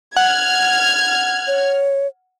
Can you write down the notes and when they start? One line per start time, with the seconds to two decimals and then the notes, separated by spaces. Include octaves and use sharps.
0.17 F#5 F6 G#6
1.47 C#5